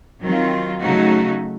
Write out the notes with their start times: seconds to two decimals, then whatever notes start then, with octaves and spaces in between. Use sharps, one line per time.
0.22 D#3 F#3 C4 F4
0.82 C#3 F#3 A3 D#4 F#4